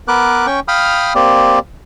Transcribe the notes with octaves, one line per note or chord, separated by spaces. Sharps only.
B3 A#4 B4 D6 F#6
C#4 G5 C#6
F5 G5 B5 D#6 F6
A#3 C4 G4 D5